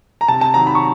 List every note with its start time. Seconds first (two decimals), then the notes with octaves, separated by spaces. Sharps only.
0.21 A#5
0.28 C3 A5
0.41 A5
0.54 D#3 F#3 A#5
0.67 B5
0.75 C#6